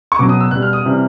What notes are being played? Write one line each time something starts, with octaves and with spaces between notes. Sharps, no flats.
C#6
B2 F#3 D6
D#6
E6
B2 G3 F#6
F6
D#6
C3 E3 G3